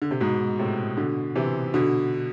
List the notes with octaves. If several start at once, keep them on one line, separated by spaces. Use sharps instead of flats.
D3
C3
G#2 B2
A2 C3
B2 D3
C3 E3
B2 D3